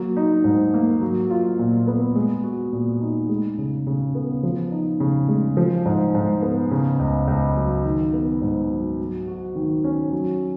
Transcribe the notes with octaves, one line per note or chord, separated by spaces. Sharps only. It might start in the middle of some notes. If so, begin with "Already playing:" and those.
Already playing: F#3 A#3
D#4
G#2
A#3
F#3
F4
A#2
B3
G#3
F#4
A#2
D#4
G#3
C#3
C#3
B3
F3
D#4
C#3
G#3
F3
G#2
G#2
B3
C#3
C#2
C#2
F#3
D#3
B3
G#2
F#3
F#3
F#4
D#3
C#4
F#3